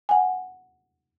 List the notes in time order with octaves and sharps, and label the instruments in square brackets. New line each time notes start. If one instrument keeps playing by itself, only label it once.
[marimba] F#5 G#5